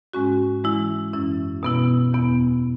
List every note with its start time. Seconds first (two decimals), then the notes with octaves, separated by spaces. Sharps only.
0.13 G#2 G#3 C#4 F#4
0.64 E3 G#3 E4
1.13 F#2 E3 C#4 E4
1.63 B2 B3 E4
2.13 E2 B2 B3 E4